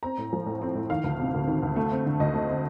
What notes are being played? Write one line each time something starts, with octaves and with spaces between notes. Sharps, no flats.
C4 A#5
A2
F3
A2
C4
A2
D#3 F5
D2
C3
D2
D#3
D2
A3
C4
D3
D2 D#5
A3
C4